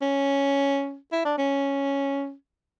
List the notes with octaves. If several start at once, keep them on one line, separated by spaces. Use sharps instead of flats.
C#4
E4
D4
C#4